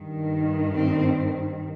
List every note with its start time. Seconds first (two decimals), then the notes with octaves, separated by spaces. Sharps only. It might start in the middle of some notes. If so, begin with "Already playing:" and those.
Already playing: G2 D#3
0.76 C4